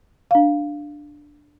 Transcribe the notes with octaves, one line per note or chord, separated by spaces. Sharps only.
D4 F5